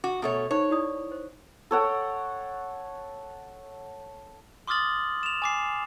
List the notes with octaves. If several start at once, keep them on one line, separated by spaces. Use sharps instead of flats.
F#4 D6
B2 A3 C#5
D#4 C5 C#5
E4 D5 D#6
C5
A4 C#5 F#5 G5
C6 D6 D#6 F6 A6 F#7
E7 F7
G#5 D6 C7